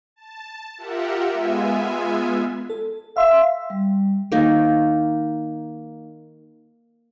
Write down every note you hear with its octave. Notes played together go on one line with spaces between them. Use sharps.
A5
F4 G4 A#4 E5 F#5
G#3 B3 F4 E5 G#5
A4
E5 F5 C6
G3
D#3 A#3 D#4